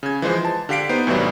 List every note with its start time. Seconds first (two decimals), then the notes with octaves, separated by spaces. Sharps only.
0.03 C#3 G#6
0.22 E3 F3 G#3 C5
0.45 A5
0.69 D3 G4 F5 B6 C7 D7
0.89 B3 D#4 C5
1.07 C2 A2 E3 F#3 G3